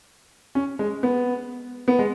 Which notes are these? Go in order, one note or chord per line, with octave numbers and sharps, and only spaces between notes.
C#4
G#3
B3
B3
G#3